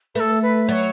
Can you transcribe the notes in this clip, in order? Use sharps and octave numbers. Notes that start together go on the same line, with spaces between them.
A3 A4 B4
B4
F#3 C#5 D5